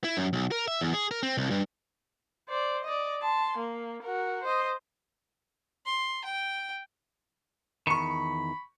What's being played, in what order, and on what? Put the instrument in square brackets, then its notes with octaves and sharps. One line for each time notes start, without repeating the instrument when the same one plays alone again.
[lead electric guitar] E4
F#2
B1
A#4
E5
E2
G#4
A#4
C4
C2
G2
[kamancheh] C5 D5
D5 D#5
A5 C6
A#3
F#4 A#4
C5 D#5
[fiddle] C6
G5
[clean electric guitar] E2 D#3 [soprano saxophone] B5 [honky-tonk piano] C#6 C#7